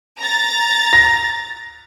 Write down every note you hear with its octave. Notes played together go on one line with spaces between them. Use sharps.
A#5 A6
A#6